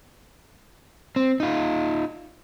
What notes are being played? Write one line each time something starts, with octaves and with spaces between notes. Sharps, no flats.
C4
D#4 F4